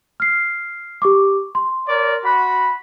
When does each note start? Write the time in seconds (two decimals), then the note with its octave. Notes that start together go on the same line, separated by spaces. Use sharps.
0.20 F6 C7
1.02 G4 C#6 D6
1.55 C6
1.88 A#4 C#5 D5
2.24 F#4 B5